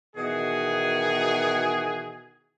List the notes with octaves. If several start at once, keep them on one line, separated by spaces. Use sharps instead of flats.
B2 D#3 E3 F#4 G#4